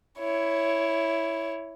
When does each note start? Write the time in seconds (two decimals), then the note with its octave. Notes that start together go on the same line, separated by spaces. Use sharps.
0.18 E4 C#5